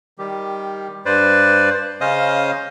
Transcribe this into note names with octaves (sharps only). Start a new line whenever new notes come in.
D#3 G3 G4
G2 B4 C5 D5
C#3 C#4 C5 D#5 F5 D#6